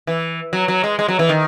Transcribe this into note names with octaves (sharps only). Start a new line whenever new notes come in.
E3
F#3
F#3
G#3
G#3
F#3
E3
D#3